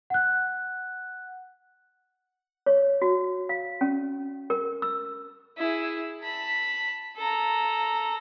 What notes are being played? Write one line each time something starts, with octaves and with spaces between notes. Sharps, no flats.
F#5 F#6
C#5
F#4
F5
C#4
A#4
E6
E4 G#4
A5 B5
A4 A#5